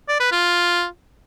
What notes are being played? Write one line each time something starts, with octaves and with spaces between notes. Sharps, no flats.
D5
B4
F4